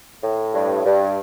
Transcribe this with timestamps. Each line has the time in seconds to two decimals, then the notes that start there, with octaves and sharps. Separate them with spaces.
0.23 A2
0.54 G2
0.85 G2